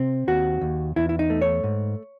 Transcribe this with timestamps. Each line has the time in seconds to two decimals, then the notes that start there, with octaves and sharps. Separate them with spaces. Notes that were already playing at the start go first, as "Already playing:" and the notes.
Already playing: C3 C4
0.27 D#2 F#4
0.61 D#2
0.96 E2 E4
1.09 E4
1.19 D#4
1.30 A3
1.42 C#5
1.64 G#2